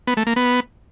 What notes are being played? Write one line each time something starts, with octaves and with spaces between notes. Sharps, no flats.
B3
A3
A#3
B3